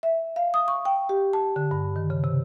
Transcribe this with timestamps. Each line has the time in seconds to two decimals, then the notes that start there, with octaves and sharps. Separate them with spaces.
0.03 E5
0.36 F5
0.54 D#6
0.68 C#6
0.85 G5
1.09 G4
1.33 A5
1.56 D3
1.71 G2
1.96 D#3
2.10 C#3
2.24 C3